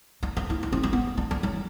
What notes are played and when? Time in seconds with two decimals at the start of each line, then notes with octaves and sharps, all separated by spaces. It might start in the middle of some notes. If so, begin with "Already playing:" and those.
0.23 D4
0.37 C4
0.50 E4
0.63 D4
0.73 C4
0.83 C4
0.93 B3
1.17 D4
1.31 D4
1.43 F#3